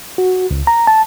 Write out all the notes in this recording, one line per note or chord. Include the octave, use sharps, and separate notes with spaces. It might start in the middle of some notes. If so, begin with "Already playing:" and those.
F#4
C#2
A#5
A5